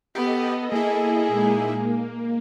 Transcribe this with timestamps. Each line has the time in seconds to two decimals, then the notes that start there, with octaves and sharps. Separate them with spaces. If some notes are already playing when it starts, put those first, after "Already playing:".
0.15 B3 G4 A4 D#5
0.72 A#3 E4 G#4
1.28 A#2 G#3 D#4
1.74 A#3